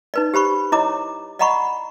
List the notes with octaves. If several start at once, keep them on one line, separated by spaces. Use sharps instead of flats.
D#4 B4 D5
G4 C5 B5 C#6
E4 C#5 D#5 A#5 D6
D5 D#5 F#5 A#5 B5 C#6